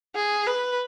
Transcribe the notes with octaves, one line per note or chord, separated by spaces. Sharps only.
G#4
B4